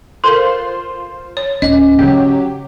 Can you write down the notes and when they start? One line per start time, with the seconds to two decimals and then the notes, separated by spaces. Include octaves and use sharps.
0.24 F4 A4 A#4 C5 C6
1.37 C#5
1.62 D1 C#4 F4 D#5
1.99 C#3 F#3 G4